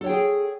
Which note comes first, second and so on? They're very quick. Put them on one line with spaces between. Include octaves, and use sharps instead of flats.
A4 C#5 G5 G#4